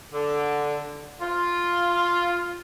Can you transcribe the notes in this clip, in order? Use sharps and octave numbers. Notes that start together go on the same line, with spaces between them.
D3
F4